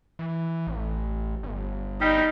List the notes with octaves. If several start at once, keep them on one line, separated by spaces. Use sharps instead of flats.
E3
A1
G1
G3 D#4